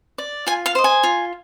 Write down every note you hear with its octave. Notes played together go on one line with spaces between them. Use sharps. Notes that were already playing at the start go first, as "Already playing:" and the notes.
D5
F4 G#5
F5
C5 D#5
G#5
F4